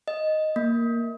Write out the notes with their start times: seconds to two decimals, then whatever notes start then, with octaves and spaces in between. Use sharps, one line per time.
0.08 D#5
0.56 A#3